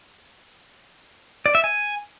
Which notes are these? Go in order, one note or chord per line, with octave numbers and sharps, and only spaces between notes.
D5
E5
G#5